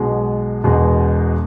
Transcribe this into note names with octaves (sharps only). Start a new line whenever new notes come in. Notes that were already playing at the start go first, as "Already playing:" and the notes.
Already playing: B1 B2 G#3
E1 E2 B2 G#3